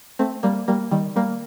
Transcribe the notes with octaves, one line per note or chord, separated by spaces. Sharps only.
A3 C4
G3 A#3
G3 A#3
D#3 G3
G3 A#3